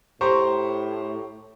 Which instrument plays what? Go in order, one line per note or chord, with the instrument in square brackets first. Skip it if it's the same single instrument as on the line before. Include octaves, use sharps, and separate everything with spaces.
[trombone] A2 [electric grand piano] G4 A#5 C#6 [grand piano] C5